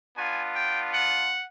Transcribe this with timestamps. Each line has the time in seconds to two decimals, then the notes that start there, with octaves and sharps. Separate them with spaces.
0.16 B3 D4 F4 G#5
0.54 G5
0.92 F#5